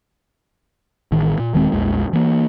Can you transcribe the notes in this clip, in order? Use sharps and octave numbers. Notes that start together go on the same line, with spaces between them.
A1 D#3
A#2
D#1 D#3 G#3 C4
A#1 E2 G#3
E3 A#3